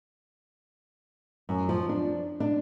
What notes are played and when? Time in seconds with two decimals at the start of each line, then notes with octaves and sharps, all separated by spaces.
1.49 F#2
1.69 F3
1.89 D4
2.40 D4